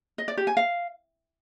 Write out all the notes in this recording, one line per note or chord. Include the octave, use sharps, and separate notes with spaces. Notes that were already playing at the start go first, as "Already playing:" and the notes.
D#5
D5
G4
G#5
F5